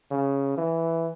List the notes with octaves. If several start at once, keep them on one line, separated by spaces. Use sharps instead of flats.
C#3
E3